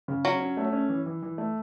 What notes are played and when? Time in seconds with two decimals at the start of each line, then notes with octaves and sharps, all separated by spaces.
0.08 C#3
0.24 F#3 C#4
0.40 C#4
0.57 A3
0.73 C#4
0.89 E3
1.06 E3
1.22 E3
1.38 A3